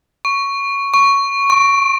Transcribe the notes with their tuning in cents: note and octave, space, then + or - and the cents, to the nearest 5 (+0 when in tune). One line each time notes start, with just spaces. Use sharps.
C#6 +5
C#6 +5
C#6 -35